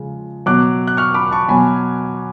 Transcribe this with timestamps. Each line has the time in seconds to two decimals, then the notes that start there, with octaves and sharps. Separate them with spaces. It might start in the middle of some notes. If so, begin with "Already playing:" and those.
Already playing: C#3 F3 G#3
0.46 B2 F#3 D6 F#6
0.87 F#6
0.97 C#6 F6
1.14 B5 D6
1.31 A5 C#6
1.49 B2 F#3 G#5 B5